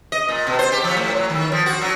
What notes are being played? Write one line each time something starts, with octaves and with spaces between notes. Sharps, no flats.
D#5
A#2
B2
C5
G4
F3
A2
F#3
D#3
F3
F#4
F#3